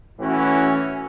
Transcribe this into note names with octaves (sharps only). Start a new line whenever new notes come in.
A2 E3 C#4 E4 F#4